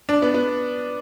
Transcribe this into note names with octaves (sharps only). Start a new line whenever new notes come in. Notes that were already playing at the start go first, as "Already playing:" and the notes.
D4
B3
B3